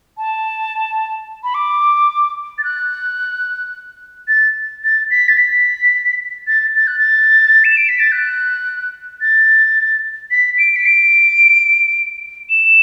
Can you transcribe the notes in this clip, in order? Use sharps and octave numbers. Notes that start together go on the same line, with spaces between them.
A5
B5
D6
A6
F#6
A6
A6
B6
A6
B6
A6
A6
F#6
A6
E7
D7
B6
A6
F#6
A6
B6
D7
B6
D7
E7